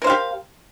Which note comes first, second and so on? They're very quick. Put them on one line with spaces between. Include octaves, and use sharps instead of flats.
A#4 C5 F5 G4